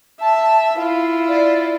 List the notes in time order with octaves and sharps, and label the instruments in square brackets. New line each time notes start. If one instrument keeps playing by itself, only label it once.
[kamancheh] E5 [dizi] A5
[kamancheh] E4 F4 [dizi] F5
[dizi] D5